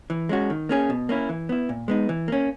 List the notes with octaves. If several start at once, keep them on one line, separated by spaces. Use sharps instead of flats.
E3
G#3 C#4 F#4
D#3
A#3 C#4 G#4
B2
A#3 C#4 E4
E3
B3 E4
A#2
G#3 B3 D#4
E3
A#3 C#4